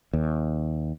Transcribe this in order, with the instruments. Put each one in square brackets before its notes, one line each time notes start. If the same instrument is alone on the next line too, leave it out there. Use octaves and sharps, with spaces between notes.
[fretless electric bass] D#2